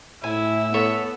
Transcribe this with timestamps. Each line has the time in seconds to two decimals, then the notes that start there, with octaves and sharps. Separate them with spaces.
0.24 A2 E4 G#5 E6
0.74 B3 A4 C#5 E5